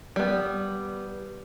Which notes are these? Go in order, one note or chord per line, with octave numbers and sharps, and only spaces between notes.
G3 B3